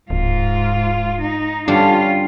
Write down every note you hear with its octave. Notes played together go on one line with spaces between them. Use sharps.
D1 G#2 F4
D#4
G2 D3 G3 C#4 D4 F4